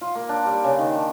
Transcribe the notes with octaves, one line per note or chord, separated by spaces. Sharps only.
F4
A#3
D4
G3
C#3
D#3
D4